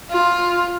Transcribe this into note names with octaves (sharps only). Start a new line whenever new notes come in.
F4